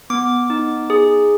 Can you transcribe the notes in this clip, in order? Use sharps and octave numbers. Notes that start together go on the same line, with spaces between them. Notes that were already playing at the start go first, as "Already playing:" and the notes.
B3 D6
D#4
G#4